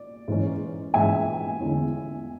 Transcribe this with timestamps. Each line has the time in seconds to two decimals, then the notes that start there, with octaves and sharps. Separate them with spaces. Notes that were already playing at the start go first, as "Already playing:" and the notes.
Already playing: D5
0.28 G#2 E3 G#3 C#4
0.94 G#2 E3 G#3 C#4 E5 G#5
1.60 E2 D3 G#3 C#4 E4